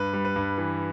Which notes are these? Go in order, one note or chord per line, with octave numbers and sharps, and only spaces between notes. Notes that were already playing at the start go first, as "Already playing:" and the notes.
Already playing: G2 B4
G3
B4
G2
E3